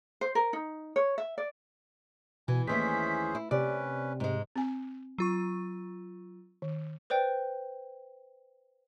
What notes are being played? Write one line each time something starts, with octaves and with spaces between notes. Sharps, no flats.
C5
A#4
D#4
C#5
E5
D5
B2 E3 G#5
D#2 E3 A3 C#4 G#4 C5 B6
E4
C3 C#4 B4 D5
G#2 G#3
C4 G#5
F#3 F4 C#6
D#3
B4 C5 D5 G5